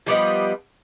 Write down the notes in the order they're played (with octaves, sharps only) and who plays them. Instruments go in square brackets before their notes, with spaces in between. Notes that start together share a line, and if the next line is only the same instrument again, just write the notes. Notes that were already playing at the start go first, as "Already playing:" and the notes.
[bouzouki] F3 G3 B3 D#5